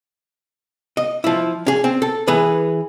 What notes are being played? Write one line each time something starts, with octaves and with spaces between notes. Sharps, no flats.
D#5
F3 E4
C#4 G#4
C4
A4
E3 G#4 B4